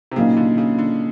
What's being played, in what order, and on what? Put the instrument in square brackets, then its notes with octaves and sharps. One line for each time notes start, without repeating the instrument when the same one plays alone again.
[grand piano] C3
[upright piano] A#2 F#3 A#3 D#4 [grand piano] C#3
[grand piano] D3
C#3
D3